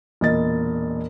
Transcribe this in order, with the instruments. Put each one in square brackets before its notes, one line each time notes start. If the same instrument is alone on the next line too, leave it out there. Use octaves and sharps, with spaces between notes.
[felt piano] E1 A#2 D#5 A6